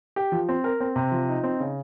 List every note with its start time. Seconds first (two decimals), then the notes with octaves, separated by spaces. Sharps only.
0.16 G4
0.32 F3
0.49 C4
0.64 A#4
0.80 C4
0.96 C3
1.11 F3
1.29 D#4
1.43 C4
1.60 C#3